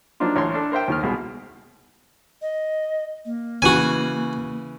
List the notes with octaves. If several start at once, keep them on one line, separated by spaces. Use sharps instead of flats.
F3 F#3 A#3 D4 D#4 F4
A1 C#5 C6
D4 A4
A#4 C5 E5 G5
D#2 D#3 F6
C2 B2 G#3
D#5
A#3
C#3 E3 F#4 G#5